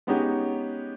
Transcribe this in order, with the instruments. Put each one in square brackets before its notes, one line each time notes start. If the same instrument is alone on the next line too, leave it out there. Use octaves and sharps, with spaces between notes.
[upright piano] G#3 B3 C#4 D#4 G4